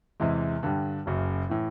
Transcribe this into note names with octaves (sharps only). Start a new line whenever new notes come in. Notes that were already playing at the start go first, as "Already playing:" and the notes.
E2 C3 E3 G#3
G2 D3 G3
F#1 F#2 C#3 F#3
A2 E3